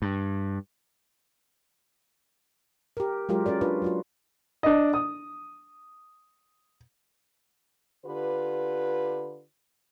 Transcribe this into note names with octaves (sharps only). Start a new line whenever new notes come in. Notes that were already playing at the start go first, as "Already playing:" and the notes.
G2
G4 A#4
F#3 G#3 F4 G4 A#4
C#4 F#4 A#4 D5
D4 F4 B4
F#3 F4 F#4
D4 D#5
D#6
D3 F4 G4 B4